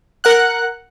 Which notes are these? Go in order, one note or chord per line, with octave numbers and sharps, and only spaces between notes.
A#4 F#5 F#6